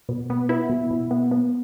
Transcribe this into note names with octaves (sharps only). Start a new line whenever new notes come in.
B2
B3
B3 E4
B2
B2
B3
B3